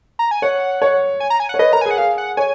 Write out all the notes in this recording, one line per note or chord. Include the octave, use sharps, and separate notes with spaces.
A#5
G#5
C#5 F#5
C#5
G#5
A#5
G#5
F#5
C#5
B4 D#5
A#4 A#5
G#5
G#4
F#5
G#4 F5
F#5
C#5 G#5